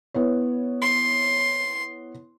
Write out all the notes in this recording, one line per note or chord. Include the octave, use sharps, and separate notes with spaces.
B3 E4 C#5
C6